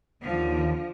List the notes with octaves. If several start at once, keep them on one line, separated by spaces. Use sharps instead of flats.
D#2 D3 F3